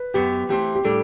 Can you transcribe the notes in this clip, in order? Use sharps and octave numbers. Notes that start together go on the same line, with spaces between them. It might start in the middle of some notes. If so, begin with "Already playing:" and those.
Already playing: B4
F#2 F#3 B3 G4
E3 A3 C4 G4
G4
A2 G3 D4 A4